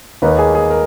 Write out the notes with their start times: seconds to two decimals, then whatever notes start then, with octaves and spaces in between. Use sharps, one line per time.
0.22 D#2 D#3 A#3 D#4 B4
0.39 G#4
0.55 G#4
0.71 A#4